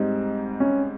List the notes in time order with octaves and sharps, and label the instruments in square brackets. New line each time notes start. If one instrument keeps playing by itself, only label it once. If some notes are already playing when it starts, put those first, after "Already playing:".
Already playing: [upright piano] G#2 G3 C4 [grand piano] D#4
[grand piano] C#4